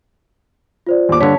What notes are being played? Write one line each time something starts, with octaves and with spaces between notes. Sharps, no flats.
F4 C5 D5
D#2 D6
G2 D3 C#5 A5 B6